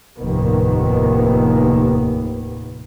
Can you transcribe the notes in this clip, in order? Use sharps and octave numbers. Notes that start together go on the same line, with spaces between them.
F1 D#2 A2 D#3 A#3 B3